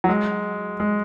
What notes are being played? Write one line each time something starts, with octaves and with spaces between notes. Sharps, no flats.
F#3
G#3
G#3